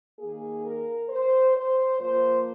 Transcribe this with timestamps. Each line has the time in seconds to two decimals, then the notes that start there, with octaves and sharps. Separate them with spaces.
0.19 D#3 A#3 G#4
0.63 A#4
1.09 C5
1.54 C5
1.98 A#2 F3 A#3 C5